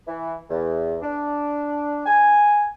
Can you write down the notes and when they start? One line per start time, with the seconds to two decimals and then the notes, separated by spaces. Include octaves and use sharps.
0.07 E3
0.50 E2
1.02 D4
2.06 G#5